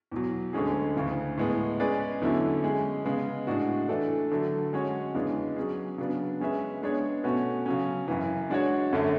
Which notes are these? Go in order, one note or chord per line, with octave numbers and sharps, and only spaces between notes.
E2 B2 F#3
D2 D3 G#3 C#4 G#4
D2 C#3 E3
A2 G#3 B3
G#3 C#4 G#4 B4 D5
E2 D3 F#3 C#4 E4
G#3 C#4 G#4
C#3 G#3 B3
A2 G#3 D4 F#4
E3 A3 D4 A4
D3 F#3 A3
G#3 C#4 F#4 C#5
E2 C#3 G#3 B3 D4
F#3 C#4 G#4
C#3 F#3 B3 D4
G#3 C#4 G#4 B4 E5
G#3 B3 D4 G#4 C#5
B2 A3 C#4 F#4 B4
C#3 F#3 C#4
F#2 C#3 E3
G#3 D4 F#4 C#5
F#2 D3 F#3 A3